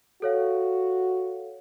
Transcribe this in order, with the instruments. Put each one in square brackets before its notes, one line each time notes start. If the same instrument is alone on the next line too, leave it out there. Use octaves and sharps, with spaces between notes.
[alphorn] F#4 [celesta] A4 C#5 F5